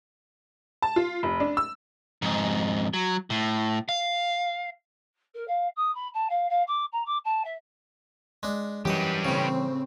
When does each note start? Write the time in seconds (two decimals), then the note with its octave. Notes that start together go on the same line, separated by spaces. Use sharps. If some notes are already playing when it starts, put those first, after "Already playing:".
0.82 A5
0.96 F4
1.23 F1
1.40 D4
1.57 E6
2.22 F2 G#2
2.94 F#3
3.30 A2
3.89 F5
5.34 A#4
5.47 F5
5.76 D#6
5.94 B5
6.13 A5
6.29 F5
6.49 F5
6.67 D6
6.92 A#5
7.05 D6
7.24 A5
7.44 E5
8.43 G#3 D4
8.85 F#2 E3 G3 G4 B4 D#5
9.25 A2 C#3 C4